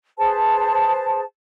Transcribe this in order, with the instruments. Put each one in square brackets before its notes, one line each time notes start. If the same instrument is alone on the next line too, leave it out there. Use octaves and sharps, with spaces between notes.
[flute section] G#4 B4 C5 A5